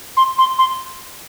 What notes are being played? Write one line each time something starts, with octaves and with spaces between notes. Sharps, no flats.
C6
C6
C6